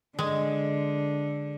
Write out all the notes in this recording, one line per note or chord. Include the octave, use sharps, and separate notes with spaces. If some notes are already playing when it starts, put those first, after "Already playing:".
D3 G#3